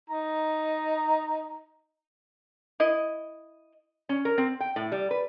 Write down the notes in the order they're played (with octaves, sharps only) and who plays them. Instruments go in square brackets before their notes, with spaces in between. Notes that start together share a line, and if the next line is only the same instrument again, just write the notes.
[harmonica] D#4 A#5
[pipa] E4 D#5
[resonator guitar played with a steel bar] C#4
A#4
C4
G5
A2
G3
B4